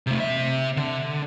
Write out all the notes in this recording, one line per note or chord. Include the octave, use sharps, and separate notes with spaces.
C3 A3
C3 E5
D3